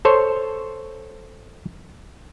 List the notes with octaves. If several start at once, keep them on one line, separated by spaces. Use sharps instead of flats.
A4 C5 C#5